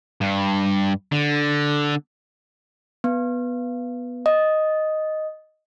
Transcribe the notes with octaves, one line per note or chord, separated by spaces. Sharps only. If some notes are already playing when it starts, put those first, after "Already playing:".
G2
D3
B3
D#5